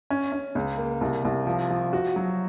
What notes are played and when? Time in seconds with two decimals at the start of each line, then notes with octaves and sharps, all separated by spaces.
0.10 C#4
0.32 C#4
0.55 C#2
0.78 A#3
1.01 C2
1.25 C2
1.47 F3
1.70 F3
1.93 F#4
2.16 F#3